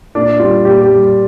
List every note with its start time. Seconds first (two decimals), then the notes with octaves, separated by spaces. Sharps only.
0.15 A#2 D4
0.40 G3 F4
0.65 A#2 G4
0.81 G4
0.89 G3